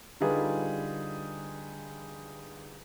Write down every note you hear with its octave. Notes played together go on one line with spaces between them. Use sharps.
D3 G3 D#4 F4 G#4 B4